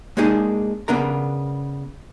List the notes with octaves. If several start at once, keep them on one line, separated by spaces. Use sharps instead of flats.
G#3 A#3 D4 D#4 G#4
C#3 B3 D4 A#4 A#5